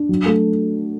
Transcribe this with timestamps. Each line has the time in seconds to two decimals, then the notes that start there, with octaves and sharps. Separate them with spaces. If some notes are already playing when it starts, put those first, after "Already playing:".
Already playing: D4
0.09 F#3
0.26 A3